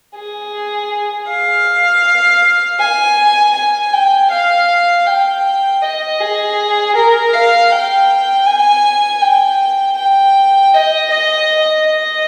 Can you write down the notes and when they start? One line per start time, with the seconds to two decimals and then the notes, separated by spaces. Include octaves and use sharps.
0.16 G#4
1.28 F5
2.80 G#5
3.55 G#5
3.92 G5
4.31 F5
5.06 G5
5.82 D#5
6.20 G#4
6.95 A#4
7.34 F5
7.71 G5
8.47 G#5
9.22 G5
9.98 G5
10.74 D#5
11.11 D#5
11.86 D#5